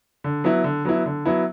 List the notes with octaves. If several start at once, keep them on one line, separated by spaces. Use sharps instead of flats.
D3
F#3 B3 E4
D3
F#3 B3 E4
D3
F#3 B3 E4